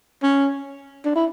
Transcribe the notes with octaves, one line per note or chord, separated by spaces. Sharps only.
C#4
D4
E4